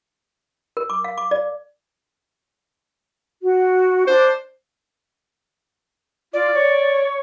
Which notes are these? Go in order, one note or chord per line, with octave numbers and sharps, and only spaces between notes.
A#4
D6
F5
D6
D5
F#4
D4 C5
F4 D5
C#5